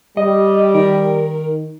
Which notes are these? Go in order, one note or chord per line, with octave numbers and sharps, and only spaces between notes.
G3 D#5
D#3 A#4